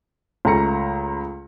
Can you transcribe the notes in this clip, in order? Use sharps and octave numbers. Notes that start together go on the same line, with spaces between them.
C#2 A3 A#5 C#7